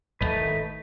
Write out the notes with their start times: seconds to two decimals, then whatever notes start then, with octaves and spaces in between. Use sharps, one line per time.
0.21 D#1 G#1 A3 D#4 B4